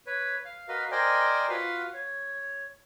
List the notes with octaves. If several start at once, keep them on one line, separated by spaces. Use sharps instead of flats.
B4 C#5
F5
F#4 A#4 B4 D#5 F5
A#4 C5 D5 D#5 G5 G#5
F4 F#4 B4 F5 F#5
C#5